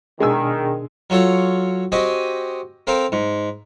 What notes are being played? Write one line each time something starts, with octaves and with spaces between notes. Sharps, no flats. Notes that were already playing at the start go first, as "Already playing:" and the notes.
B2 D#3 G#3 D4 G#4 G#5 E6
F#3 F4 A4 C#5 F#5
C4 F#4 G4 D#5 G#5
C4 A4 A#4 F5 G5
G#2